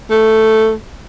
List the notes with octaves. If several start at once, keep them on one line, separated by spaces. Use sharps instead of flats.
A3